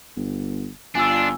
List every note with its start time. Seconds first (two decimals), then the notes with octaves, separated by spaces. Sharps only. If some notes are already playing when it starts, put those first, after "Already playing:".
0.17 G1
0.95 G1 F2 D4 F4 G#5 E6